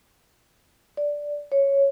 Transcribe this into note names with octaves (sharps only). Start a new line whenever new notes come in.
D5
C#5